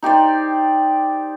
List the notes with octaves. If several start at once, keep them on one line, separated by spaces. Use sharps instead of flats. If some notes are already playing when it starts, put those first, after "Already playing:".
D#4 G4 C5 D5